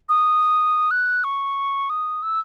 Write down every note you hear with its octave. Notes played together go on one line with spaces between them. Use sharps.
D#6
F#6
C#6
D#6
E6